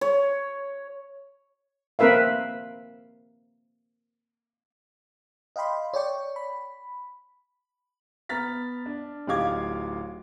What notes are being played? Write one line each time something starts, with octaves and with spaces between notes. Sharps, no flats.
C#5
A#3 C4 A#4 B4 E5 F5
D#5 F5 G5 B5 C6
C#5 D5 G5 C#6
B5
B3 A#5 F6 A6 B6
D4
D1 D#4 G4 F5 D6 G#6